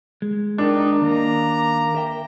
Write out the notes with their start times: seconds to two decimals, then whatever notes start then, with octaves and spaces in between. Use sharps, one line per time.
0.22 G#3
0.58 D#3 D4 D#4
1.01 D#2 A#3 A#5
1.95 A#4 E5 G5